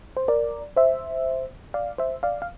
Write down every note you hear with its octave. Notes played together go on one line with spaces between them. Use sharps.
C5
A#4 D5
C5 E5
D5 F5
C5 E5
D5 F5
F5